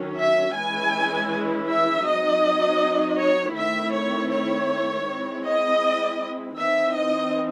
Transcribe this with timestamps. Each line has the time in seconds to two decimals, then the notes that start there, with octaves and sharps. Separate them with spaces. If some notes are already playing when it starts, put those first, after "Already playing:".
Already playing: D#3 F#3 C#4
0.18 E5
0.55 E3 G#3 C#4 E4 G#5
1.68 E5
2.05 F#3 C4 D#4 D#5
3.18 C#5
3.56 D#3 A3 C4 E4 E5
3.94 C#5
4.32 C#5
5.07 G#3 C4 E4
5.45 D#5
6.58 E3 C4 D#4 E5
6.96 D#5